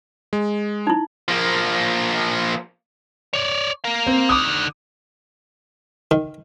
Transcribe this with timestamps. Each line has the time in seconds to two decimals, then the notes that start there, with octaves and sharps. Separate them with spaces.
0.33 G#3
0.87 D#4 E4
1.28 F3 A#3
3.33 C#5 D5
3.84 A#4 F5
4.07 C4
4.29 D3 D#4 D6 D#6
6.11 D#3